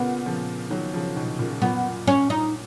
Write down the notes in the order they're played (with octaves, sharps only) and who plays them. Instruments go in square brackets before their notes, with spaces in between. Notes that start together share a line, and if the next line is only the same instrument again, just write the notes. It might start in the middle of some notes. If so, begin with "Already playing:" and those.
Already playing: [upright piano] A#2 C#3 [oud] B3
[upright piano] C#3 F3
D#3 F#3
C#3 F3
B2 D#3
A#2 C#3
[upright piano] F#2 A#2 [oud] B3
[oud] C#4
D#4